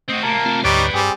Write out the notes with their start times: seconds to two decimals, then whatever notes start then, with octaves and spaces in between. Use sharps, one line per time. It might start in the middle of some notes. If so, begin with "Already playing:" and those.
0.09 A3 C4 F#4 D#5
0.23 C3 A#3 A#4 A5
0.45 A3 C4 F4
0.64 D2 G#2 D3 G3 D#4 B4 C#5 D5
0.93 G2 G3 C4 G#4